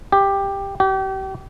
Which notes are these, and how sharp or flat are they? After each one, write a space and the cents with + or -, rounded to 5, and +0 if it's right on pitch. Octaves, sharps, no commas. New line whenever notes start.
G4 +10
G4 -35